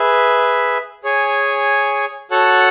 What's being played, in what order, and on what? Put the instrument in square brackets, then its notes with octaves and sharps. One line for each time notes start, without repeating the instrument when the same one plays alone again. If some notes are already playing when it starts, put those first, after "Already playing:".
Already playing: [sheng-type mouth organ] G#4 B4 E5
G#4 C#5 G#5
F#4 A4 C#5 F#5 A5